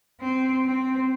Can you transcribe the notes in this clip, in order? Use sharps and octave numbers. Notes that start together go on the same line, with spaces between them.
C4
C4